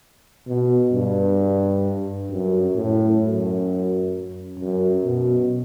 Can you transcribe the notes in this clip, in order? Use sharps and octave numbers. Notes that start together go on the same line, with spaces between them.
B2
G2
F#2
A2
F#2
F#2
B2